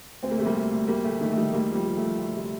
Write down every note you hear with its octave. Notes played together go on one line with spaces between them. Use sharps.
D2 C4
A#3
C3 A3
G3 A#3
D2
D2
D2 G3 A#3
D2 A3
D#3 A3
A3
D#3 G3
D2 G3 A#3
F3 G3
F3
A3
F3
D2
C3